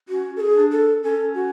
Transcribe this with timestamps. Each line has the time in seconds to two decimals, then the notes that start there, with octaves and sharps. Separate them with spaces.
0.09 C#4 F#4
0.36 A4
0.41 G#4
0.57 D4
0.72 A4
1.03 C#4 A4
1.34 F#4